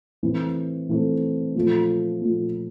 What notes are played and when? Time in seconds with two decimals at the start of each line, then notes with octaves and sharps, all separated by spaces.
0.23 A2 E3 A3 C4
0.89 A2 E3 A3 C4
1.55 A#2 F3 A3
2.22 A#2 F3 A3